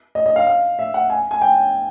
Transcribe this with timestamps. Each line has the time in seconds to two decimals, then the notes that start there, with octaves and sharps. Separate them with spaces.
0.15 D#5
0.26 D#5
0.36 F5
0.47 F5
0.79 E5
0.94 F#5
1.10 G#5
1.31 G#5
1.42 G5